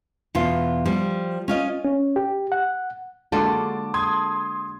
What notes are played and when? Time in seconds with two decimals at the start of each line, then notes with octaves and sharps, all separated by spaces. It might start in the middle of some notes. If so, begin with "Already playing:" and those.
0.35 E2 B2 F4
0.86 F3 G3
1.48 C#4 F4 D#5
1.85 C#4
2.16 G4
2.52 F#5
3.32 D3 G#3 A#3 F4 F#4 A4 A5 D6
3.94 C6 D#6 G#6